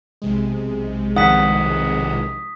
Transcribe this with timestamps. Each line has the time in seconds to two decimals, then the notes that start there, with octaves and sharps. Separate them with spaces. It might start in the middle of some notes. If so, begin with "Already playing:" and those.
0.22 B1 C3 G#3
1.16 D#3 F3 F#5 D#6 B6